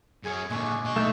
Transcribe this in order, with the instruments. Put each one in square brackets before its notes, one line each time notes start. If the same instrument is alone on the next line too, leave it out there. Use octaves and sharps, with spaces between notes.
[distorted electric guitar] F#2 C#4 [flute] G#4
[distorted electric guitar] A#2 D3 [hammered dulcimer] G#3 D4 [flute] C#6
[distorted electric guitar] B2 D#5 [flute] C#6
[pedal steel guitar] A3 G6 [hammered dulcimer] D#4